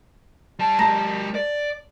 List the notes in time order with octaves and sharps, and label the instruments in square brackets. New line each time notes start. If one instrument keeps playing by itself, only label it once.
[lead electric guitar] G3 A5
[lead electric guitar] G#3 G4 [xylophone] A5 A#5 A#6
[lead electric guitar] D5